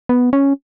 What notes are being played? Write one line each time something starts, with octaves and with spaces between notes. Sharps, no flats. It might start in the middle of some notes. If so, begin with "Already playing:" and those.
B3
C#4